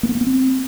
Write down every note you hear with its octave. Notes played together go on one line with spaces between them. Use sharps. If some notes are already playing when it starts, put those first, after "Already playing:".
A#3
B3
A#3
B3
C4